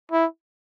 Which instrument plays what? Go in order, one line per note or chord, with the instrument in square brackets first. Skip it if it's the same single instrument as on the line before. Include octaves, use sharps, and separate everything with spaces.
[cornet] E4